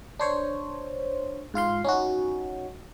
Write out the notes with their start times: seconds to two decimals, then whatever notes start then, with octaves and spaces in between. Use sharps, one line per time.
0.20 D4 C5 C#5
1.54 G#2 F4 F5 C6
1.84 C#4 D#4 F#4